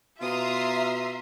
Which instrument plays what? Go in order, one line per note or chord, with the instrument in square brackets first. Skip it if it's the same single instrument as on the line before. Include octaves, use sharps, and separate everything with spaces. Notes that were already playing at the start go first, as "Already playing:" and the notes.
[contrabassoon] B2 [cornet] F4 [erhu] E5 [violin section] A#5 C6 D#6